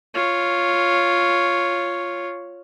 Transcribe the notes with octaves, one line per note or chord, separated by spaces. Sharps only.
F4 C#5